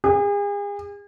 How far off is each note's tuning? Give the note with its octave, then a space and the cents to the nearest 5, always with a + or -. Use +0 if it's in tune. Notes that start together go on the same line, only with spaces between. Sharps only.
G#4 -40